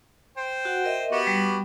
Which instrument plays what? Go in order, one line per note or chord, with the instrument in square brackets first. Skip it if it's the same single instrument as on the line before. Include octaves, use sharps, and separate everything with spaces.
[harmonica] C5 G5
[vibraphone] F#4 F#5
A#4 D#5 E5
[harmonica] B3 F#4 G4
[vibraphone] G3